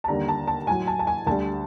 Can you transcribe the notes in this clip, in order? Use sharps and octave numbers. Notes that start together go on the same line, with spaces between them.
A5
D#2 D3 G3 A#5
A5
A5
A2 F#3 G#5
A5
A5
G#5
D2 D3 G3 A5